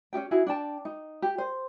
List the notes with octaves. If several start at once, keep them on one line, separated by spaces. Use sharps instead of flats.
C#4 D#4 G4 G5
E4 F#4 G#4
D4 G5 A5
D#4
G4
C5